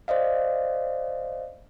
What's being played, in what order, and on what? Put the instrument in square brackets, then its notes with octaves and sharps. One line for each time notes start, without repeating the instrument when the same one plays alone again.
[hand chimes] C5 D5 D#5 F5